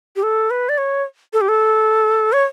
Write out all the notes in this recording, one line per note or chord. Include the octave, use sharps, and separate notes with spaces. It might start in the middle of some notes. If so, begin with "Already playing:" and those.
G4
A4
B4
D5
C#5
A4
G4
A4
C#5